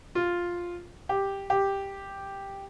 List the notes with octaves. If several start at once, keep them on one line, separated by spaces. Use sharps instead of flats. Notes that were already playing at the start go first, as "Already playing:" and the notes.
F4
G4
G4